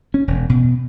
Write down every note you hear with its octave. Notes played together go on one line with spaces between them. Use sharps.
C#4
E1
B2